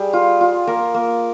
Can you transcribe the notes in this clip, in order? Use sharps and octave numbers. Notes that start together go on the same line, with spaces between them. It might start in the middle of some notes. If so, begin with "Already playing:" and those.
Already playing: G3 G#4
F4
F4
A#3 A#4
A#3